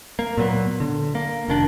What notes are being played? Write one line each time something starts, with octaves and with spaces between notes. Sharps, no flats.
A#3
A#2 F#3 B3
D3
A#3
F1 D#3 D4